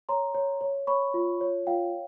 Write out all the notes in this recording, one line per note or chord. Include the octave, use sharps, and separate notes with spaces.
C#5 A#5 C6
C#5
C#5
C#5 B5 C#6
F4
C#5
F4 F5 G5